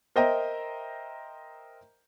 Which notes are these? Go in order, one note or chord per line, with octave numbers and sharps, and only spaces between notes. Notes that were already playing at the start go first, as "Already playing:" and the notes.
A#4 C5 D#5 E5 G5 A#5